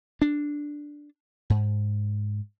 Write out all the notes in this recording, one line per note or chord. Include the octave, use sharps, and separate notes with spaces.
D4
G#2